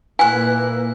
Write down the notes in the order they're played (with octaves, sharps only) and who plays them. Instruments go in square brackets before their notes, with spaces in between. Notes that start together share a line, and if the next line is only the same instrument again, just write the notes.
[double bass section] A#2 A#3 [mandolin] E4 F#6 [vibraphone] B4 [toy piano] G#5